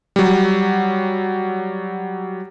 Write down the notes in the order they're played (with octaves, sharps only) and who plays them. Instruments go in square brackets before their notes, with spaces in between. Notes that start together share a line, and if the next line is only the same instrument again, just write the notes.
[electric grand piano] F#3 G3